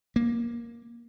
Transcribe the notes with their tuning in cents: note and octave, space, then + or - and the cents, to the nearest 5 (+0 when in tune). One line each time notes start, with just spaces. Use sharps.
A#3 +10